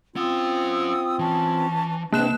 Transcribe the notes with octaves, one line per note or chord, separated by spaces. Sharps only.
C4 C#4 F4 F#5 D#6 E6
E3 C#4 A5
C2 E3 A#3 C4 D4 F#6 E7